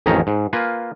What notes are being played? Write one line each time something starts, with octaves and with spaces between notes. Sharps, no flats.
A1 F2 D#3 C#4 A#5
G#2
A#3 F4 B4 G#5